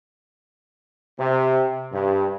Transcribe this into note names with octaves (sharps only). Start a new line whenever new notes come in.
C3
G2